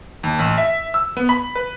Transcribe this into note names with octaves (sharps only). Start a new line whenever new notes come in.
D#2
A1
E5
E6
B3
B5
B4